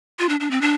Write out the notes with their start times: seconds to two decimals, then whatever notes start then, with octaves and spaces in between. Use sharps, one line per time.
0.19 F4
0.29 D4
0.40 D4
0.51 C4
0.61 D4